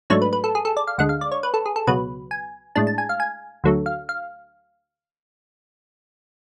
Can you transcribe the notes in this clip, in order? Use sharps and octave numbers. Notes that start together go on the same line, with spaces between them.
G#2 F#3 A3 D4 C#5
B4
B4
A4
G#4
A4
D5
F5
D2 D3 G#3 F#5
F5
D5
C#5
B4
A4
G#4
A4
C#2 B2 F#3 B3 B4
G#5
A2 G#3 D4 A5
A5
G#5
F5
G#5
D2 D3 F#3 A3
F5
F5